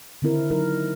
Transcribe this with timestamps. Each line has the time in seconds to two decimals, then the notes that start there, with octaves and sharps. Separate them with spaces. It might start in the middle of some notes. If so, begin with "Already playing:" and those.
0.22 D3 D#3 C4 E4 A#4
0.50 F#3 D#4 A#4